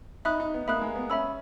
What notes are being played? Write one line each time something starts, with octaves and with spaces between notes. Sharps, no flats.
D#4 E5 B5 D#6 F#6
D#4
B3
A#3 E5 B5 D#6 F#6
G#3
B3
C#4 E5 B5 E6